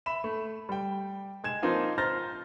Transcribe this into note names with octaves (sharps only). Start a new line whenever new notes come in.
E5 B5 E7
A3
G3 G5
G#3 G#6 E7
F3 A#3 C4 D#4 F4
C5 A#5 F6 G6 A6 A#6